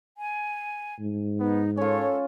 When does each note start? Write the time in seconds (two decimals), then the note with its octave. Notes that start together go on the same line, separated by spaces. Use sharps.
0.17 G#5
1.00 G#2
1.40 B3 D#4
1.77 C#4 F4 A4 C#5